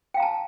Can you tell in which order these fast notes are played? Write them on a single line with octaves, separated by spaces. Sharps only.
G5 F5 A#5 A5